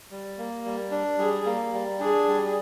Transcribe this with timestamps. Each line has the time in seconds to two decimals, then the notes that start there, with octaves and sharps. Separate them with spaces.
0.11 G3
0.38 A#3
0.65 G3
0.91 D4
1.18 G3 G#4
1.46 A#3
1.73 G3
2.00 D4 G#4
2.28 G3